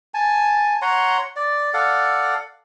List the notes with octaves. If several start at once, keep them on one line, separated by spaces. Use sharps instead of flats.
G#5 A5
C#5 F#5 A#5 C6
D5
A4 D5 F5 F#5